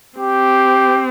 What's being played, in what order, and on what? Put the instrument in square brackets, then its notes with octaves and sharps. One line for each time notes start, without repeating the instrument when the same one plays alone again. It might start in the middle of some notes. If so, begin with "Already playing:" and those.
[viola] C4 [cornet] G4